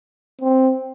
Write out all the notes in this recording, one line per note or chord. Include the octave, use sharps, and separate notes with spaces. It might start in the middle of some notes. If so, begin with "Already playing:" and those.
C4